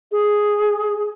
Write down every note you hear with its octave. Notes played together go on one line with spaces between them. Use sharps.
G#4